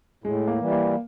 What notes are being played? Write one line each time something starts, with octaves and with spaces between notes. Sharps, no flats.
A2 G#3
A#3
E3 G3
A#3